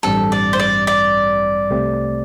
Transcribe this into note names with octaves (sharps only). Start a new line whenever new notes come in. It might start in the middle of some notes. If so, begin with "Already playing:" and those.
A1 G2 G3 C4 A4
D5
C5
D5
D5
C2 C3 A3 C4